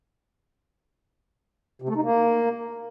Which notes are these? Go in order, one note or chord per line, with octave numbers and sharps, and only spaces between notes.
C3
A3
D#4
A#3